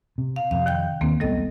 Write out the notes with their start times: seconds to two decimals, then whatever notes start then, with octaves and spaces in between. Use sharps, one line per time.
0.18 C3
0.36 F5
0.51 F2 C3 F5
0.66 D#3 G5 G6
1.01 D#2 D#3 A#3 C4
1.20 E1 B1 G3 B3 A4 D#5